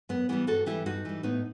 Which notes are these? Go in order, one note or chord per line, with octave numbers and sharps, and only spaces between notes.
F#2 B3
E3 G3 B3
G2 F#4 A4
E3 G3 E4 G4
G2 D#4 F#4
E3 G3
A2 B3 D#4